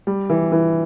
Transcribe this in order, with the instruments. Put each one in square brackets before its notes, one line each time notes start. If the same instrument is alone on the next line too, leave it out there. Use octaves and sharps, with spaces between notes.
[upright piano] G3
E3
E3